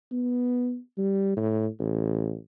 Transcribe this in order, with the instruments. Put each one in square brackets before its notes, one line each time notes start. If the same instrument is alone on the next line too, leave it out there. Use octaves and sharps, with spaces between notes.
[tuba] B3
G3
A2
A1